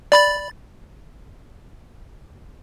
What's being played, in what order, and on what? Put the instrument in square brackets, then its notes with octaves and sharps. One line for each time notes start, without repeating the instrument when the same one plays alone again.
[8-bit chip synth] D5 B5 A6